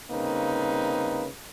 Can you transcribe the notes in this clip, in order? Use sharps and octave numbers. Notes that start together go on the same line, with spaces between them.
C2 C#3 A#3 C4 D#4 B4